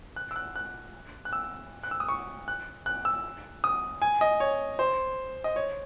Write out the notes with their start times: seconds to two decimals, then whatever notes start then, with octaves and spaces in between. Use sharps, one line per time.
0.16 F#6
0.31 E6
0.36 F#6
0.56 F#6
1.25 F#6
1.33 E6
1.83 F#6
1.91 E6
2.00 D#6
2.09 C#6
2.48 F#6
2.86 F#6
3.05 E6
3.64 D#6
4.02 G#5
4.21 D#5
4.40 C#5
4.79 C5
5.44 D#5
5.56 C#5